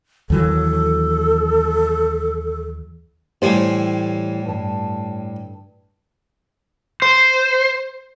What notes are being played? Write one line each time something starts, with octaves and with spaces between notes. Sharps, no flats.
D#2 E3 F#3 A4
A2 E3 G3 G4 C5 G#5
G2 A5
C5